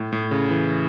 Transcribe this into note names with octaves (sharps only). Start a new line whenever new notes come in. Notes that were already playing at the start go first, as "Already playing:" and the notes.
Already playing: A2
A2
C#3
E3